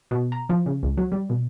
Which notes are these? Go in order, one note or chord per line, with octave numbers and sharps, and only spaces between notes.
B2
A#5
F3
C#3
C#2
F#3
G3
B2